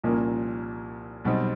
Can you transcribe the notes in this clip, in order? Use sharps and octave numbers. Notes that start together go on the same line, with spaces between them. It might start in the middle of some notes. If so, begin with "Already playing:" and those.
C2 A#2 F3 A#3 C#4
B1 B2 G3 C4